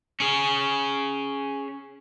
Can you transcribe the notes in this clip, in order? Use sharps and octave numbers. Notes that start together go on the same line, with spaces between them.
C#4 G#4